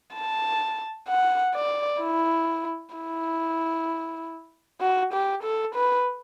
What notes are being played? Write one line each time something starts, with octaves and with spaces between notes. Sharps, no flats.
A5
F#5
D5
E4
E4
F#4
G4
A4
B4